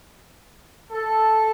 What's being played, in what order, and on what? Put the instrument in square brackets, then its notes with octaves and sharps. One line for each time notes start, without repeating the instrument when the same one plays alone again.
[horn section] A4